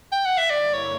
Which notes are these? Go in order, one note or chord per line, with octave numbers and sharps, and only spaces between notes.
G5
F#5
E5
G2 D3 A#3 E4 D5
C#5